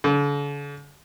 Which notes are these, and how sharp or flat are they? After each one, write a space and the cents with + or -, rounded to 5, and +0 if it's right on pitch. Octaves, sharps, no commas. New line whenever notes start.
D3 -45